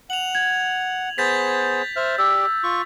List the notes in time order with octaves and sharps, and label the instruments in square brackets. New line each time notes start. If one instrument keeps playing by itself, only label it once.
[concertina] F#5 [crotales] F7 F#7
[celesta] G#6
[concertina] B3 G#4 C5 [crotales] G6 A6 B6
[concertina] C5 E5 F6
[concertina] G4 D5 [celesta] E6
[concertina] F4 C#6